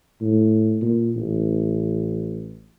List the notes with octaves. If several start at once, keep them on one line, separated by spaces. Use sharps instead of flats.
A2
A#2
A1